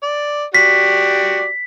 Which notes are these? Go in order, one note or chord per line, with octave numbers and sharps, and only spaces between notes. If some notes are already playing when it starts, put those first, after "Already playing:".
D5
F#4 G4 D5 B6